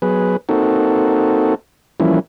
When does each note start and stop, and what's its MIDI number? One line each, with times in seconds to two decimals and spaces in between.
0.02 0.37 54
0.02 0.37 59
0.02 0.37 68
0.02 0.37 71
0.49 1.55 58
0.49 1.55 60
0.49 1.55 63
0.49 1.55 66
0.49 1.55 69
2.00 2.19 52
2.00 2.19 53
2.00 2.19 55
2.00 2.19 58
2.00 2.19 61
2.00 2.19 64